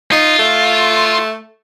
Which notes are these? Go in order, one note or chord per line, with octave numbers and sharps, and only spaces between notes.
D#4 F4
A3